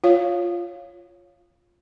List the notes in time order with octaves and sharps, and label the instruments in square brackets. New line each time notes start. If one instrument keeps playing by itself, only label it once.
[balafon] F4 C#5 F5